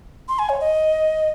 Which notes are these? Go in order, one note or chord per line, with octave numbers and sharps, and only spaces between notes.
C6
G#5
C#5
D#5